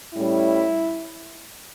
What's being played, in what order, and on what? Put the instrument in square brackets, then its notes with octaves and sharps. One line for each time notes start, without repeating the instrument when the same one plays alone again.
[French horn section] A2 G3 C#4 E4